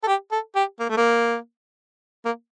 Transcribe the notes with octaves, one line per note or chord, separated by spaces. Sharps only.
A4
G4
A4
G4
A#3
A3
A#3
A#3